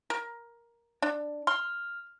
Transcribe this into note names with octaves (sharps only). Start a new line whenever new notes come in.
A#4
D4
C6 F6